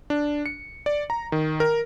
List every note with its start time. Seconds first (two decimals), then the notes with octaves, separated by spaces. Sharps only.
0.10 D4
0.46 C#7
0.86 D5
1.10 A#5
1.32 D#3
1.60 A#4